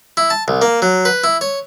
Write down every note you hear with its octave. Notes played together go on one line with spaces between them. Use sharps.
E4
A5
C2
A#3
F#3
B4
E4
C#5